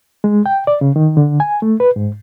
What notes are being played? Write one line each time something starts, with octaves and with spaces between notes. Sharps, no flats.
G#3
G5
D5
C#3
D#3
D3
G#5
A3
B4
G#2